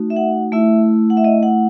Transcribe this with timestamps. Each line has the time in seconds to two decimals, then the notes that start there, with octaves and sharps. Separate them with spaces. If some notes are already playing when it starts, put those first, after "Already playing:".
Already playing: A3 D#4 F#4
0.10 E5
0.16 F#5
0.52 A3 E4 E5
1.10 F#5
1.17 E5
1.24 D#5
1.43 F#5